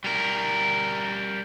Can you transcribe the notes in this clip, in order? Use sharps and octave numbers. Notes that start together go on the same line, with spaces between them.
G3 A#4